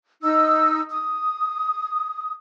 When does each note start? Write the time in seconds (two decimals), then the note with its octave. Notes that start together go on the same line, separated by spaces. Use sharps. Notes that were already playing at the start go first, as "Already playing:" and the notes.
0.22 D#4 E6
0.90 D#6